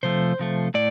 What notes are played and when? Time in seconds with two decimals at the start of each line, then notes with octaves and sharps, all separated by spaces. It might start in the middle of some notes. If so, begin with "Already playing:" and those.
0.03 C3 F3 A3 C5
0.39 C3 F3 A3
0.74 A2 D5